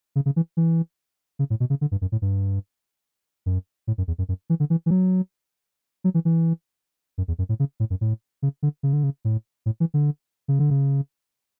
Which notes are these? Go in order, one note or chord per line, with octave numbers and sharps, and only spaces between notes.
C#3
C#3
E3
E3
C#3
A2
B2
C#3
D3
G2
F#2
A2
G2
F#2
A2
F#2
E2
F#2
F#2
E3
D3
E3
E3
F#3
F#3
E3
E3
F#2
E2
F#2
A2
C#3
A2
F#2
A2
C#3
D3
C#3
D3
C#3
A2
A2
E3
D3
C#3
D3
C#3